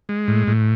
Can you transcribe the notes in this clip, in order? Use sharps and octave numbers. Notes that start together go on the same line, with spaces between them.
G#3
A2
A2